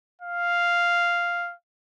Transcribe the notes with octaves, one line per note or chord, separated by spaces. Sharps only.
F5